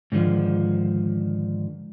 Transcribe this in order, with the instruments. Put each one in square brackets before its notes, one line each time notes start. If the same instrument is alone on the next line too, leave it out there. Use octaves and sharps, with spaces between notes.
[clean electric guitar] G#2 D3 D#3 F3